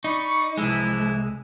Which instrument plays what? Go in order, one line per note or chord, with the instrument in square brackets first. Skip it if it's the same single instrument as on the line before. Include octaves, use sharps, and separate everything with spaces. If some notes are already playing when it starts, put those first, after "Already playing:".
[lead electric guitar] D#4 [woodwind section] D5 B5 C#6
[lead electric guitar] C2 G#3 [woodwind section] E3 F3 E4